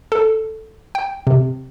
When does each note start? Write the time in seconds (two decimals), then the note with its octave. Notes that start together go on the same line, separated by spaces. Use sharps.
0.12 A4
0.95 G5
1.27 C3